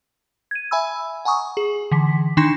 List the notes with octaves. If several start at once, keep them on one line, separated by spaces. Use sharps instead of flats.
G#6 D#7
E5 G#5 B5 E6
F#5 G#5 A#5 C#6 D#6
G#4
D3 E3 B6
D#3 D4 D#4 C6 A#6 E7